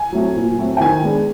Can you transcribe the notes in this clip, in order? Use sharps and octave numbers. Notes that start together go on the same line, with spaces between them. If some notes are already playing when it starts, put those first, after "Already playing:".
Already playing: G#5
F#3 A3 C4
A#2
F#3 A3 C4
G5
D#3 G#5
G#3 B3 D4